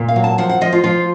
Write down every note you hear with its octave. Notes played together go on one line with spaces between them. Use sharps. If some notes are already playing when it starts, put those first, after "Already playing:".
Already playing: A#2
F5
F#3
A5
F3 F#5
F#5
F3 D#5
F4
F3 F4